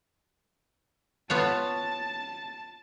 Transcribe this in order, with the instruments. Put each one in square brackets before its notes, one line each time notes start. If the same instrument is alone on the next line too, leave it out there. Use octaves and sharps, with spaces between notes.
[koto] B3 F4 C#5 [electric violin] A5